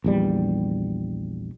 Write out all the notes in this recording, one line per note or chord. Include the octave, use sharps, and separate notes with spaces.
A#1 E2 G3